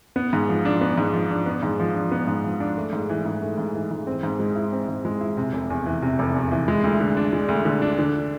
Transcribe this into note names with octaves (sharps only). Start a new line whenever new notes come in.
B3
G#2
F3
D4
B3
G#2
F3
D4
B3
G#2
F3
D4
B3
G#2
F3
D4
A3
G#2
E3
G#2
A3
G#2
E3
G#2
C4
G#2
G#3
E4
C4
G#2
G#3
E4
C3
F1
E2
E3
C3
F1
E2
E3
G#3
D2
D3
D4
G#3
D2
D3
D4
D3